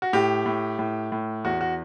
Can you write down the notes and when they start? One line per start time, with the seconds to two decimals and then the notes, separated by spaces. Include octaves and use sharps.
0.02 F#4
0.13 A2 G4
0.46 A2
0.79 A2
1.12 A2
1.44 E2 F#4
1.61 F#4